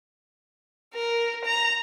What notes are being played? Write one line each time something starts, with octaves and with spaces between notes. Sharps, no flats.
A#4
A#5